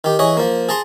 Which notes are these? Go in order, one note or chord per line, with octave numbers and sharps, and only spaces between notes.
D#3 G4
E3 G#4 C#5 D#5
F3 A#3
G#4 A5 A#5 C6